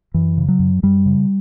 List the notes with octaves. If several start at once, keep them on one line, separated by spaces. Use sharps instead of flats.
F#2 E3
C#3
F#3
F#2
F#2 G3
C#3